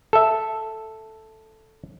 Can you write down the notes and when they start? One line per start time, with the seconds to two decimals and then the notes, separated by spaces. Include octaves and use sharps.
0.13 A4 E5